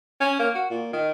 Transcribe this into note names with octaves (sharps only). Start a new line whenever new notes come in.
C#4
A#3
F#4
A#2
D#3